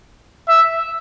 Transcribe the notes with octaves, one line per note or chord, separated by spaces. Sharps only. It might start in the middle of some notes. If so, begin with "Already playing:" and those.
E5